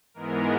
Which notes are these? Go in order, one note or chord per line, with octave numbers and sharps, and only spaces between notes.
G#2 E3 G#3 B3 A#4